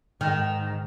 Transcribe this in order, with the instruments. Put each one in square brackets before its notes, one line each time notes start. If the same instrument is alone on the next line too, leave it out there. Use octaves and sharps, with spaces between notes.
[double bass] G#2 [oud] D#3